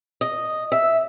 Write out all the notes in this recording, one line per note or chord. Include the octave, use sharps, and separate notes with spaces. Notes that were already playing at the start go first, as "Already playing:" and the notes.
D#5
E5